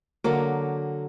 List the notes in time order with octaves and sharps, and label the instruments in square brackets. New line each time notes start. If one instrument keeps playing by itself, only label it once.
[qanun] D3 F#3 D6 [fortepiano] A#3